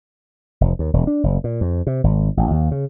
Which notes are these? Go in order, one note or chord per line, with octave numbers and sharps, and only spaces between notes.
F1
D#2
E1
D4
F#1
A#2
F2
C3
G#1
A1
D#2
C#3